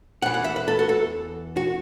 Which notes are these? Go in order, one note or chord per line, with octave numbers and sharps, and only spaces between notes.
E2 E3 F#5
F#5
E5
B4
A4
F#4
A4
F#4